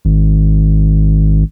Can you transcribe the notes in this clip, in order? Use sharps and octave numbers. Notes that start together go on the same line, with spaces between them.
G#1